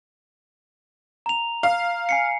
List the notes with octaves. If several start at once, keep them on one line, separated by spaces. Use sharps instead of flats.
A#5 F7
F5
G#5 C7 C#7